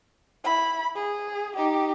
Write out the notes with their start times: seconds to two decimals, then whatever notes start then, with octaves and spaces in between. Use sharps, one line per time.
0.44 E4 B5
0.95 G#4
1.56 D#4 G4